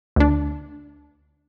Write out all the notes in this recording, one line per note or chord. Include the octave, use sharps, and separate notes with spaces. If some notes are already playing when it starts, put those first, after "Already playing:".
D2 D4